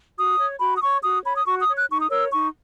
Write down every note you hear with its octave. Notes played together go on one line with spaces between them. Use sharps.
F#4 D#6
C#5
F#4 B5
D#6
C#5 C#6
F#4 D#6
C#5 B5
D#6
F#4 C#6
D#6
C#5
F#6
D#4 C#6
D#6
A#4 C#5 E6
D#4 C#6